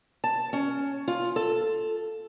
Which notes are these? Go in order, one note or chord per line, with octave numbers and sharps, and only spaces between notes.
A5
C#4
F4
A4